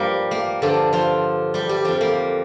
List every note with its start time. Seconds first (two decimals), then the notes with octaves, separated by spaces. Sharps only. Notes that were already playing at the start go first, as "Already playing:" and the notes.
Already playing: G2 F3 G3 A#3 G4 A#4
0.31 A#3
0.62 G2 D3 F3 D4
0.93 F3 F4
1.54 G3 G4
1.69 G3 G4
1.85 F2 F3 G3
2.01 A#3